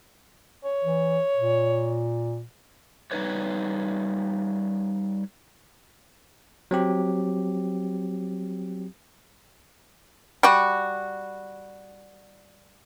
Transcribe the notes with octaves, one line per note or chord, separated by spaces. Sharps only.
C#5
E3
A#2
G3 A#3 D#4 B4 C#5
F#3 C4 G4
G3 F#4